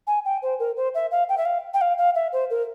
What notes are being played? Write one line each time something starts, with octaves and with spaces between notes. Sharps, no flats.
G#5
G5
C5
A#4
C5
E5
F5
G5
E5
F5
G5
F5
F5
E5
C5
A#4